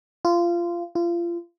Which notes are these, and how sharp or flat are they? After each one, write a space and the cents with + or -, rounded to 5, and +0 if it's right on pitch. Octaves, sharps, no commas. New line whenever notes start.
F4 -20
F4 -30